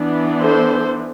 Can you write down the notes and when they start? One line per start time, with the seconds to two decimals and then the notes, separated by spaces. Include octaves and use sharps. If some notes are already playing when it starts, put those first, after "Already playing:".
Already playing: E3 B3 D4
0.40 A4 C5